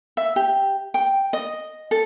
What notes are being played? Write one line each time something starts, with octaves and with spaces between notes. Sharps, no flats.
E5
G4
G5
D#5
A4